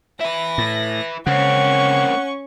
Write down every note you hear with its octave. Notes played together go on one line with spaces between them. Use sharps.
E4 B4 A#6
A2
C#3 A#3 C4 C#4 F#5 C#6